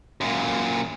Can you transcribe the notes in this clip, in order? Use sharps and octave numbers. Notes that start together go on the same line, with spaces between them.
F#2 A#2